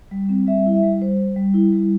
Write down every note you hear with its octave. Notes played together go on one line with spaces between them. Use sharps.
G3
C4
G3 E5
E4
E5
G3
G3 C5
G3
G3
E4
G3